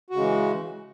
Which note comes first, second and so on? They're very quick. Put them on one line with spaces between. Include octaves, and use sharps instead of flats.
F#4 C#3 G#3 E3